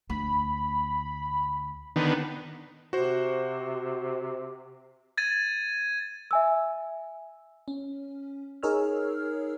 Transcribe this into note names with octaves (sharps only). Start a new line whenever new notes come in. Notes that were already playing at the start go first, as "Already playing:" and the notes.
D2 B5
D3 D#3 B3
C3 F#4 C5
G#6 A6 D#7
E5 G#5 E6
C#4
D#4 G#4 A#4 C#5 E6 F6